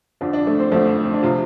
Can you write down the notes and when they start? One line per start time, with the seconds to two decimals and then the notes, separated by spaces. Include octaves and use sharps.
0.21 F2 D3 F3 D4
0.33 D4
0.47 A3 A4
0.59 C4 C5
0.72 F2 D3 F3 A3 A4
1.04 C4
1.13 D4
1.23 C3 F3 F4